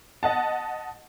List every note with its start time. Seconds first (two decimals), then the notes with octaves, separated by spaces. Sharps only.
0.23 D#5 F#5 A5